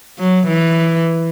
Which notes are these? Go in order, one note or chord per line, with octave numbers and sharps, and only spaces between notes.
F#3
E3